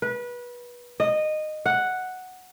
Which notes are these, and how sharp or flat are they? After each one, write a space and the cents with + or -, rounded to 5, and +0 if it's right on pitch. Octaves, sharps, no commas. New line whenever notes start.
B4 -25
D#5 -15
F#5 +0